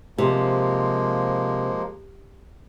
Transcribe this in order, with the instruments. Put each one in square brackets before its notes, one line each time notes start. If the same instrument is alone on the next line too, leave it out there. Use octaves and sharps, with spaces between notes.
[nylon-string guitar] C3 [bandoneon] F3 G#3 A#3